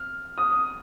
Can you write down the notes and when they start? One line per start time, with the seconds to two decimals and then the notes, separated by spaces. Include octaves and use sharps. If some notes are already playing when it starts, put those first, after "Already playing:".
Already playing: F6
0.38 D#6